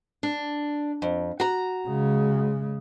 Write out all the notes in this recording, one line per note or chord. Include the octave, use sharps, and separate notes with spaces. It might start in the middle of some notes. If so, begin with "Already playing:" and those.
D4
F2
F#4 A#5
C#3 G#3